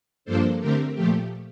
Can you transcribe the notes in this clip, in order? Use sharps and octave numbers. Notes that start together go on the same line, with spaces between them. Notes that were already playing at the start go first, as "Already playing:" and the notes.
G2 F3 A#3 D4 A4 C5
D3 A3 C4 G4 A#4
A#2 F3 A3 G4